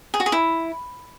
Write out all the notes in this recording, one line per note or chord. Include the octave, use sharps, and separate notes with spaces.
G#4
F#4
G#4
E4